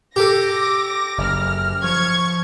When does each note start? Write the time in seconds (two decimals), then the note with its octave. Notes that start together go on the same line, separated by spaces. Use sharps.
0.16 G4 A4 D6 A#6
1.18 F#1 F6
1.84 F3 C#6 G#6